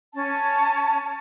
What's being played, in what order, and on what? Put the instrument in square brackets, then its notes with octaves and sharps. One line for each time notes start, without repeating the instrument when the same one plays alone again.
[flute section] C#4 A5